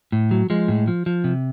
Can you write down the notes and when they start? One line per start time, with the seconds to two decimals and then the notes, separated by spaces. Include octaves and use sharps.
0.12 A2
0.31 F#3
0.50 F3 G#3
0.68 A2
0.88 F3
1.06 F3
1.24 C3